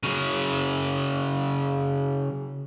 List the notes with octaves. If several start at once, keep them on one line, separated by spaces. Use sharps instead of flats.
C#3 F#3